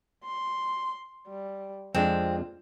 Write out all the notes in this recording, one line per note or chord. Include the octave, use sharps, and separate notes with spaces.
C6
G3
F2 G#3 C4 D4 F4